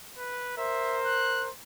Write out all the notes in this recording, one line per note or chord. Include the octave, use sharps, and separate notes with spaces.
B4
A#4 C5 E5
F#6